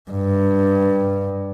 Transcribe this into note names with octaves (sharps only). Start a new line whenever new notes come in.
G2